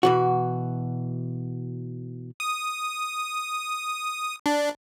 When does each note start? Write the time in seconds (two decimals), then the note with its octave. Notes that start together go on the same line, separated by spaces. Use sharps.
0.03 B2 E3 F#4
2.40 D#6
4.46 D4